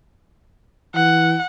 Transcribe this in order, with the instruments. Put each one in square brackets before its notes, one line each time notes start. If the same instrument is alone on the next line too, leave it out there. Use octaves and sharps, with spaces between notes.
[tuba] E3 [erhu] F#5